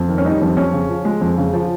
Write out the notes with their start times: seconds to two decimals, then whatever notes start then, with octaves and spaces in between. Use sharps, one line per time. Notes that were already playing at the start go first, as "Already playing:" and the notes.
Already playing: F2
0.09 D#3
0.18 C#4
0.25 G3 D#4
0.42 F2
0.57 F2 C#4
0.73 C#3
0.89 F3
1.05 G#3
1.21 F2
1.38 C#3
1.53 F3